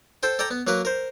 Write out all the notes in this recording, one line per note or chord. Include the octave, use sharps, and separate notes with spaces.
A4 C5 G5
A4 D5 G5 A#5
B3
F#3 A#3 A#4 B4
A#4 C5